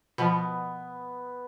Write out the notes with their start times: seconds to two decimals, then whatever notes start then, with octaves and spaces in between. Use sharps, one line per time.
0.18 B2 F3 B3